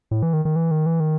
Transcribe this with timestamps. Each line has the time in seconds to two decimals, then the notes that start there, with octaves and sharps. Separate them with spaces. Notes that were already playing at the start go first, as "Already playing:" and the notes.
0.11 A2
0.23 E3
0.33 D#3
0.45 D#3
0.56 E3
0.71 D#3
0.86 E3
1.00 D#3